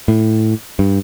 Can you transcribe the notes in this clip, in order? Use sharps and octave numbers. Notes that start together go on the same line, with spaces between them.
A2
G2